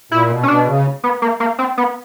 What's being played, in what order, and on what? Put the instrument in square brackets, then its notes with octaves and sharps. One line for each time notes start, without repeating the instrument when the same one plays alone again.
[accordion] A#2 [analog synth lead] E4
[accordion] B2
[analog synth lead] C#4
[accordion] B2 [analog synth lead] D4
[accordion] C#3
[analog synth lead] B3
A#3
A#3
C4
B3